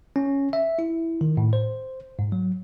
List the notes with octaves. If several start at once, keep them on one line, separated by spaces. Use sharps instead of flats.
C#4
E5
E4
D#3
A2
C5
G#2
F#3